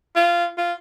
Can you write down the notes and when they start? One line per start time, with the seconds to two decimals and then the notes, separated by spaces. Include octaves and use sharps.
0.16 F4
0.58 F4